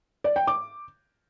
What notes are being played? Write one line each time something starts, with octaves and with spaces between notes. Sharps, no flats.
D5
G5
D6